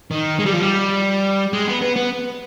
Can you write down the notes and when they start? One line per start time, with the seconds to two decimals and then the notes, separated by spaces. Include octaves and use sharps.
0.11 D#3
0.39 G#3
0.46 G3
0.53 F3
0.60 G3
1.53 G#3
1.68 B3
1.82 B3
1.96 B3